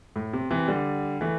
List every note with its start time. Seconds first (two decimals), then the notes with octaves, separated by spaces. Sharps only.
0.16 A2
0.33 C3
0.51 C3 E3
0.68 D3 G3
1.21 E3 A3